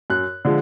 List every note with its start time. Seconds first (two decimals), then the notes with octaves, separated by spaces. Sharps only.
0.10 F#2 F#6
0.45 D3 F3 G#3